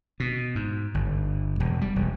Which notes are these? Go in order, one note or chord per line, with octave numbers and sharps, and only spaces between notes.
B2
G#2
G1
E1
G3
E1